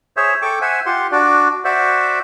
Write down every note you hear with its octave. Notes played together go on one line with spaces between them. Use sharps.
G#4 C5 C#5 E5
A4 G5 C#6 D6
C5 E5 F#5 G#5
F4 G4 F#5 C6
D4 F#4 D5
F#4 C5 D5 E5 F#5